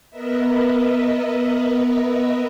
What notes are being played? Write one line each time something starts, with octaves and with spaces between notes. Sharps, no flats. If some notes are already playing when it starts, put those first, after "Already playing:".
B3 A#4 B4 D#5 E5